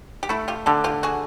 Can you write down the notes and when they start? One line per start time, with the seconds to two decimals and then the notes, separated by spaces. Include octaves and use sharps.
0.23 G4
0.29 A3 E4 F#4
0.48 F4 G4
0.66 D3 G4 A4
0.84 F4 G4
1.03 F#4 G#4